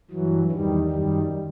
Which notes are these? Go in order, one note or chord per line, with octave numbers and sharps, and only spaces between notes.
G2 E3 F#3
E2 D#3 G3
F#2 D#3 G3